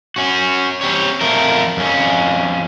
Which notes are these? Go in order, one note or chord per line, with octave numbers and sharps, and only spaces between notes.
C#4 F#4
C4 G4 C#5
F2 A3 A#4
F2 C#4